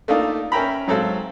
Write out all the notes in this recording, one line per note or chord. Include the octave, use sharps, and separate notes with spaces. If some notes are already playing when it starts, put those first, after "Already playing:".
A3 A#3 D4 D#4 F4
C#4 A#4 E5 G5 A#5 B5
G#2 F#3 C4 A4 F5